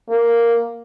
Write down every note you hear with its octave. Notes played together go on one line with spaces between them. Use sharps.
A#3